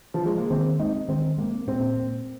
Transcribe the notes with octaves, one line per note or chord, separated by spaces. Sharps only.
F3
G#3
A#3
D#3 C4
G#3 C4 D#4
D#3 C4
G#3 A#3 C4
A#2 C4
A#3